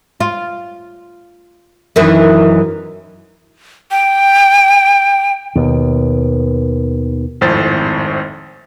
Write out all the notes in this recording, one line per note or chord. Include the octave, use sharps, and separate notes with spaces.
F4
F#2 D#3 E3
G5
D#2 B2
G#1 F2 A2 C5 A6